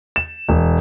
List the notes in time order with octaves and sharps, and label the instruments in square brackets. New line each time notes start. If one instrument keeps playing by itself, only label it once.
[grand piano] E7
E1